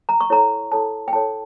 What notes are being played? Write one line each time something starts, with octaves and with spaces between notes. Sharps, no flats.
A#5
C#6
E4 A4 C#5 A#5
E4 A4 C#5 A5
G5
E4 A4 C#5 A5